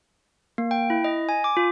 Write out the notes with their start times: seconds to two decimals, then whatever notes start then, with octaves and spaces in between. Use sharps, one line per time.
0.58 A#3
0.71 G5
0.90 E4
1.04 D#5
1.29 G#5
1.44 D6
1.57 F4